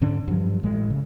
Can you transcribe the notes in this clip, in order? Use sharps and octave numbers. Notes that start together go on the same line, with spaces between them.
G#2 D3 C#4 D4
G2 F3 F#3
A1 A2 G#3
C#3